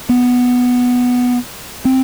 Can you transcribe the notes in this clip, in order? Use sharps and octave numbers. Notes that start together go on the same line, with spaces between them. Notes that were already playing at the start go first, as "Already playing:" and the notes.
B3
C4